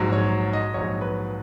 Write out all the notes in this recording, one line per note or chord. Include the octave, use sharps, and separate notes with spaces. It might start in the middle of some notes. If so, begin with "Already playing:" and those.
Already playing: A#1 G#2 F#3
C#5
D#5
A#1 G#2 F#3 C#5
B4